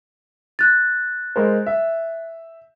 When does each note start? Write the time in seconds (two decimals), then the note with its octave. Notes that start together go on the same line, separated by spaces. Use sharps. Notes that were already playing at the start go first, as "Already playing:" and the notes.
0.59 F#6 A6
1.36 G#3 A#4 C5
1.66 E5